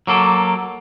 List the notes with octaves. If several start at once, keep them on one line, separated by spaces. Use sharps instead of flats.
F#3 A#3 A4